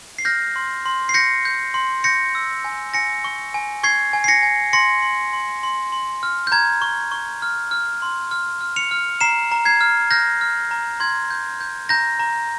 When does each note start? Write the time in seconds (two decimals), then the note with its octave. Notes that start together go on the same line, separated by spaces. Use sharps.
0.19 C7
0.25 F6 G6 A#6
0.56 C6
0.86 C6
1.09 C7
1.14 G6 A#6 C#7
1.45 G6
1.74 C6
2.04 G6 A#6 C#7
2.35 E6
2.65 G#5
2.94 G#5 A#6 C#7
3.24 C#6
3.54 G#5
3.83 C#6 G#6 C7
4.13 G#5
4.24 C7
4.28 A#6 C#7
4.43 G#5
4.73 C6 A#6 C#7
5.02 C6
5.33 C6
5.63 C6
5.92 C6
6.23 F6
6.47 G6
6.52 A#5 G#6
6.82 C#6
7.11 C#6
7.42 F6
7.71 F6
8.02 C6
8.31 F6
8.61 F6
8.76 C#7 F7
8.91 F6
9.21 A#5 C7 E7
9.52 A#5
9.65 G#6 C7
9.81 F6
10.11 F6 G6 A#6
10.41 F6
10.71 A#5
11.00 C6 G#6
11.31 G6
11.61 G6
11.89 A#5 G6 A#6
12.19 A#5